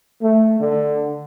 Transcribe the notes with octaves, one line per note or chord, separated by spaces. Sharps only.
A3
D3